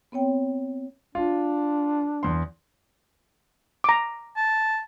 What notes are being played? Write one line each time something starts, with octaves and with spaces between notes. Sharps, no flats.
B3 C4 C#5 G5
D4 F4
E2 C6
A#5 D6
A5